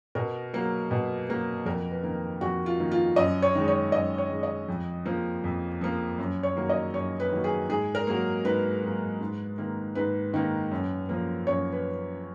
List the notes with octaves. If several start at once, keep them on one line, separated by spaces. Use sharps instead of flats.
B2 A#4
F#3 A#3
B2
F#3 A#3
F2 A#4
B4
D#3 A#3
F2 F#4
F4
D#3 A#3
F4
F#2 D#5
C#5
D#3 G#3
C#5
F#2 D#5
C#5
D#3 G#3
D#5
F2
F3 A#3
F2
F3 A#3
F#2
C#5
D#3 F#3 A#3
D#5
F#2 C#5
B4
D#3 F#3 A#3
G#4
G#2 G#4
A#4
F#3 A#3
G#2 B4
F#3 A#3
G#2
D#3 A#3
G#2 B4
D#3 A#3
F#2
F3 A#3
F#2 C#5
B4